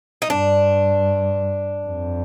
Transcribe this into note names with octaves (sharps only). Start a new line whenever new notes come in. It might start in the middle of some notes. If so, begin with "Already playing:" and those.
D#4
G2 D4
F2